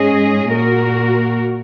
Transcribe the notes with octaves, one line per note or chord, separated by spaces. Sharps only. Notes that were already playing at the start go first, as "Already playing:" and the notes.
Already playing: G#2 G#3 C#4 G#4 D#5
A#2 A#3 F#4 A#4